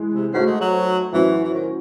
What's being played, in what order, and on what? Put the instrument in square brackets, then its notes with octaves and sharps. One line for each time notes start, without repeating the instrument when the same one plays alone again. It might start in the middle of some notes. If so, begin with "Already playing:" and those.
Already playing: [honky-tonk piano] A2 E3 G#3
[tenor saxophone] C3
[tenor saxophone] C#3 [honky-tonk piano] A3 D#4 F#4 C5
[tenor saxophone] G#3
F#3
[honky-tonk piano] A2 F#3 C#4 F#4 C5 [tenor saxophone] E3
[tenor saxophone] E3
D#3